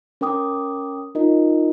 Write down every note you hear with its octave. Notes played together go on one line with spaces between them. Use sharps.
C#4 A#4 G5 D6 D#6
D#4 F4 A#4 D#5